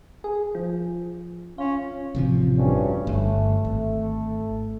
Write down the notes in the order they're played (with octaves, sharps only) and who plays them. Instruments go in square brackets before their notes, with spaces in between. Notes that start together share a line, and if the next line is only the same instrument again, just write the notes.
[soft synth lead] G#4
F3
[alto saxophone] C#4 [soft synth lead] F4
[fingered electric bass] A1 C3 F3
[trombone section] D2 G2 C#4
[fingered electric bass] G1 [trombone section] A3
[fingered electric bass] G#1